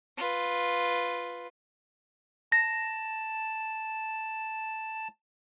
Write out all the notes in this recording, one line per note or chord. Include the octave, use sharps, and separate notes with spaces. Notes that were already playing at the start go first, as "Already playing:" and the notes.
F4 B4
A5 A#6